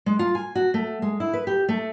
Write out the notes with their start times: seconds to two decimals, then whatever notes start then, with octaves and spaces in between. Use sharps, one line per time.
0.06 G#3
0.19 F4
0.35 G#5
0.55 F#4
0.74 A3
1.02 G#3
1.20 E4
1.33 B4
1.47 G4
1.69 A3